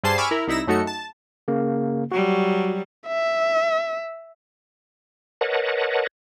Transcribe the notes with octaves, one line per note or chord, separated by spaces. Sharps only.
G2 G3 G#4 C5 A5 C7
G#5 B5 C#6 D6 E6 F6
E4 A#4
C2 D#4 E4 E6 A#6
F#2 A3 D#4 F#4 A4 C#7
A5
C#3 A#3
F#3 G3 F#4
E5
A#4 B4 C#5 D#5 F#5 A5